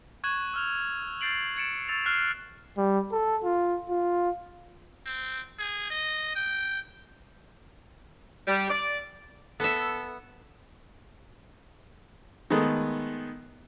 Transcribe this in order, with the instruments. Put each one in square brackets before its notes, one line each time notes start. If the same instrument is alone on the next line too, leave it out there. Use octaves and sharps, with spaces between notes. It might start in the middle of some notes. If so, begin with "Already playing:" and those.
[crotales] C#6 F#6 G#6 E7 F#7
E6 F6 F7
F6 G6 A6 C7 D7 F#7
G#6 A6 C#7 D7 E7
C#6 E6 A6 F7
F6 F#6 C7
[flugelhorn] G3
A4
F4
F4
[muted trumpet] C4
G#4
D#5
G5
[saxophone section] G3
D5
[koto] B3 E5 [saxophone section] A4
[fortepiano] D#3 G#3 A3 B3